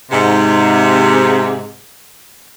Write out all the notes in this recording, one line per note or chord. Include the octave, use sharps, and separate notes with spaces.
G#2 C3